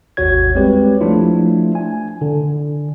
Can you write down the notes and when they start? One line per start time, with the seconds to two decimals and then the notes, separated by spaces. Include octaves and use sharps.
0.17 G#1 D#2 F#4 C#5 G#6
0.55 G3 G#3 C4 G4 B4 C#5
1.01 F3 A3 D4 E4 F4
1.75 G#5
2.22 D3